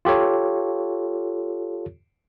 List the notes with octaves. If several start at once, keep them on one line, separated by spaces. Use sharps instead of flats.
F4 G4 A4 C#5